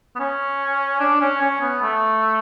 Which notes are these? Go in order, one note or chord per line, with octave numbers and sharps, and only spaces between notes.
B3
C#4
D4
C#4
C#4
B3
A3